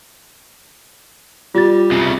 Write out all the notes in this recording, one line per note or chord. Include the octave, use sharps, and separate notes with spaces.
G3 F4 A6
C2 C#3